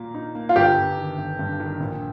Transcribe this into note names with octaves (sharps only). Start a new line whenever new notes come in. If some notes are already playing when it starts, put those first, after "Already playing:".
Already playing: A#2 A#3
D#4
A#3
F4
G1 G4
G1
D#3
G1
G2
D#3
A#1